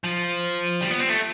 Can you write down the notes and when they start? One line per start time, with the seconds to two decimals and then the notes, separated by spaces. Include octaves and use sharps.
0.04 F3
0.81 G3
0.90 B3
1.00 C4
1.09 A3